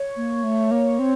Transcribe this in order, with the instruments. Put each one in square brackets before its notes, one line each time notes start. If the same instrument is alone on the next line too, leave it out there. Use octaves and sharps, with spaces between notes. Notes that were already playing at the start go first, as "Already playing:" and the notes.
Already playing: [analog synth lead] C#5
[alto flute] A#3
A3
A#3
C4